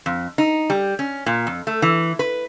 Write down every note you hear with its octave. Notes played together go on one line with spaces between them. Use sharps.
F2
D#4
G3
C#4
A#2
F2
A3
E3
B4